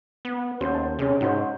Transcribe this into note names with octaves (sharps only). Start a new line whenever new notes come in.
B3
D#2 C#4 F#4 C5
A5
C3 C#4 G#4
G#2 D#4 F#4 C5